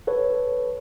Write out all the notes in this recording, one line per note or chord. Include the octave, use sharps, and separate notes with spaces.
A4 B4 C#5